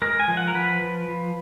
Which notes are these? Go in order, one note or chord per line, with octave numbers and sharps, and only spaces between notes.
G#3 A#4
G#5
F3
F#5
A#4
F3 B4
F3
F3